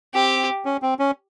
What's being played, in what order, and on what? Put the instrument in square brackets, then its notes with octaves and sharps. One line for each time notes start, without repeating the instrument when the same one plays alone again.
[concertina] C4 [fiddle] G4
[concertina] C#4
C4
C#4